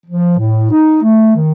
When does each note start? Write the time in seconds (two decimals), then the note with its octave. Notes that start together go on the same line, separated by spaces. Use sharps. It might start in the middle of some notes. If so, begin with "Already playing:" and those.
0.07 F3
0.38 A2
0.71 D#4
1.02 A3
1.35 D#3